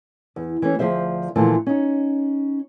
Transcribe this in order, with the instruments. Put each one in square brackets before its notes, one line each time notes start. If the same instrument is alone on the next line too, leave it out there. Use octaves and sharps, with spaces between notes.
[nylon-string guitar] E2
E3 A3 C#4
D2 F3 G#4 C5 E5
A#2 D3 E3 F3 A3
C#4 D#4